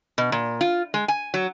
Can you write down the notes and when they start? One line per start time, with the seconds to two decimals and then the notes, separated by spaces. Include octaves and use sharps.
0.18 B2
0.32 A#2
0.61 F4
0.94 G#3
1.08 G#5
1.34 F#3